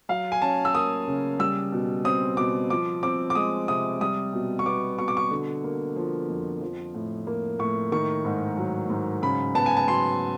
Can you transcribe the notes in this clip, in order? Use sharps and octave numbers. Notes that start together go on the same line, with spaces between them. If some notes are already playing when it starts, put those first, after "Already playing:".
F#3 F5
G#5
C#4 A5
E6
A#3 D#6
C#3
G3 E6
B2
C4 D#6
B2 D6
F3 D6
C4 D6
D6
G#3 D#6
C3 D#6
G3 D#6
B2
C#6
B3 D6
B2 C#6
D6
C#6
D3
A#3
F3
F2
F3
A2
A#3
A2 C#6
D#3 C#6
G#2
F#3
G#2
C#3 B5
B3 A5
G#5
A5
F#3 C6